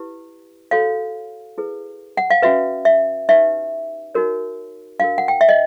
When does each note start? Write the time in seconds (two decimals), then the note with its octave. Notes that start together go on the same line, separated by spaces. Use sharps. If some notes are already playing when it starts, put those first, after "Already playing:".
Already playing: E4 G4 B4
0.71 F#4 A4 C#5 F5
1.58 E4 G#4 B4
2.17 F#5
2.30 F5
2.42 C#4 F#4 B4 E5
2.85 E5
3.29 D#4 G4 B4 E5
4.15 D#4 F#4 A#4 C#5
4.99 D4 F#4 A#4 F5
5.18 F#5
5.28 G5
5.41 E5
5.49 D#5